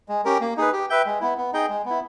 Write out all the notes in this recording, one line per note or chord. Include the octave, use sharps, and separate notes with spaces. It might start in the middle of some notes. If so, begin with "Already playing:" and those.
G#3
C#4 G4 A#4
A#3
D#4 G#4 B4
G4
B4 E5 G5
G#3
B3 E4
B3
D#4 G#4 D#5 G5
G#3
B3 E4